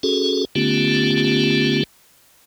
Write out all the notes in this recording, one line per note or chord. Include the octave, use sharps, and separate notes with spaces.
C#4 F#4 G#4 A4
D3 A3 B3 C#4 F4 G4